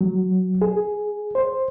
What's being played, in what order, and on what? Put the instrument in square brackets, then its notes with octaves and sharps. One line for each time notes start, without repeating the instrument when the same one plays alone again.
[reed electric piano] F#3
G#4
C5